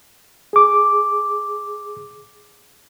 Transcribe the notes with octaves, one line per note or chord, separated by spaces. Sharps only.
G#4 D6